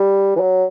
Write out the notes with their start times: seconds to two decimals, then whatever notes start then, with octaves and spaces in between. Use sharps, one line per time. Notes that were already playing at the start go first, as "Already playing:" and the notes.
Already playing: G3
0.36 E3
0.40 F#3